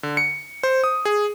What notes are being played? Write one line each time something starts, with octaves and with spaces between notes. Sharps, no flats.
D3
C#7
C5
D#6
G#4